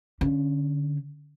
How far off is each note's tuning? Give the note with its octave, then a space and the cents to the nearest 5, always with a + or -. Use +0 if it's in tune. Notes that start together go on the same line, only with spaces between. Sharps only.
D3 +0 C#4 +0